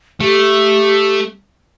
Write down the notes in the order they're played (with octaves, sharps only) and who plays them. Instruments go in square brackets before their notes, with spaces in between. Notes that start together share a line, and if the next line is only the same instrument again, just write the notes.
[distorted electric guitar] A3 [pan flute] G4